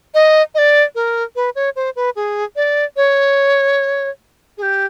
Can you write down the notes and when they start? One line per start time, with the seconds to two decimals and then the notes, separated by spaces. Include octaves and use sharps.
0.14 D#5
0.55 D#5
0.58 D5
0.95 A#4
1.36 B4
1.55 C#5
1.76 C5
1.96 B4
2.16 G#4
2.56 D5
2.97 C#5
4.58 G#4
4.62 G4